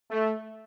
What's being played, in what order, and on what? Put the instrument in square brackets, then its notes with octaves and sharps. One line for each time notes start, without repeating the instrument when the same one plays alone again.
[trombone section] A3